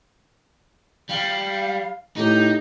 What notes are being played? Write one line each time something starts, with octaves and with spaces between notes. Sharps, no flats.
G3 F5
A2 D#4 G4